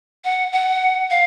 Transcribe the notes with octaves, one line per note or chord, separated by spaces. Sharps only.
F#5
F#5
F5